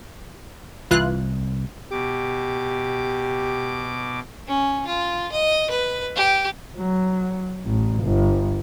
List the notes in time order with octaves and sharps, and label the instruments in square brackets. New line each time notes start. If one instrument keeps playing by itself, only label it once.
[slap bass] C2 [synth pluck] E3 F4 F#6
[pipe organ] B2 D6 [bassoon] G4
[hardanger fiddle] C#4
F4
D#5
B4
G4
[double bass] F#3
A1
G1